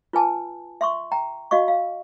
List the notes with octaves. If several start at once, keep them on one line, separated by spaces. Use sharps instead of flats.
F4 B4 G#5 A5
E5 C6 C#6
G5 A#5
F#4 D#5 F5 C#6
F5